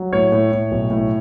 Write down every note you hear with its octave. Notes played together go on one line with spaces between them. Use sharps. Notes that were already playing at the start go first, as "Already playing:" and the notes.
Already playing: F#3
A2 C#5
A2
A2
B1
A2